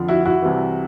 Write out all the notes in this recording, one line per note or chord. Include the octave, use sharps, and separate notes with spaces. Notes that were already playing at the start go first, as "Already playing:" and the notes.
Already playing: F2 D3 F3
E4 F#4
E4 F#4
C2 C3 E3